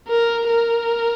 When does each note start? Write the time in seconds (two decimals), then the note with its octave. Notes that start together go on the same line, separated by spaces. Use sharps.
0.09 A#4
0.48 A#4